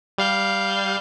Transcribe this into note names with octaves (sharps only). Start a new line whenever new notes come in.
G3 F5 G6